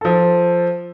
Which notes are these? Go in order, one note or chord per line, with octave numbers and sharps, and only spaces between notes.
F3 A4